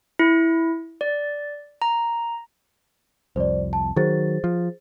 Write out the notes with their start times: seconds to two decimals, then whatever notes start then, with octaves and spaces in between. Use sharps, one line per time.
0.19 E4
1.01 D5
1.82 A#5
3.36 C2 F2 C5 D5
3.73 A5
3.96 D#3 F#3 G#4 C5 A6
4.44 F3